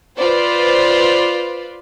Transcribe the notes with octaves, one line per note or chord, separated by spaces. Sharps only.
F4 B4 C5 D5